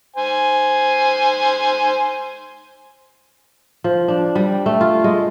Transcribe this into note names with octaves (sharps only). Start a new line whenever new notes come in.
C5 G#5
F3
D4
G3
A3
F4
G#3